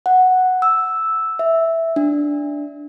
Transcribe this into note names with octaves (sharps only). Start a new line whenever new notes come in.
F#5
E6
E5
D4